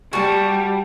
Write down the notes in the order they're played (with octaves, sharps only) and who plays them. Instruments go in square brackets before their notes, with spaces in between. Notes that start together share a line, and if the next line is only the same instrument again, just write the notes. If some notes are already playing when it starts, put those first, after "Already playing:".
[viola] G3 [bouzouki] F#4 A5